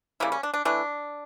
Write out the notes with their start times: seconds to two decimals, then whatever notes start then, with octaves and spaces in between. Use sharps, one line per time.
0.20 C#3 G3 A#3 E4
0.32 C#4
0.43 D4
0.54 D4
0.65 E3 A3 D4